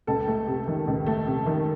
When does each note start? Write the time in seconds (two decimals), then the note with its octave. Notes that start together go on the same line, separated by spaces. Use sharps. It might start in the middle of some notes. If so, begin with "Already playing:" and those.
0.07 C#2 A4
0.27 A3
0.47 C3
0.68 D#3
0.87 C#2
1.06 A3
1.27 C3
1.46 D#3